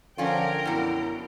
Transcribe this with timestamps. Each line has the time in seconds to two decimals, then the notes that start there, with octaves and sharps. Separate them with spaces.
0.18 D3 F3 C#4 F4 A#4 G5
0.65 F#2 B2 D3 E4